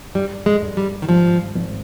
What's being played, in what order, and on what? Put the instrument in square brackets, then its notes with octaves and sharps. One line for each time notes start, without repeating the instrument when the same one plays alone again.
[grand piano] G2 [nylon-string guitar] G3
[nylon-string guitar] G#3
[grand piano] G2
[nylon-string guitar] G3
D#3
[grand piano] G#1 [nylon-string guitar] F3
[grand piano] G#1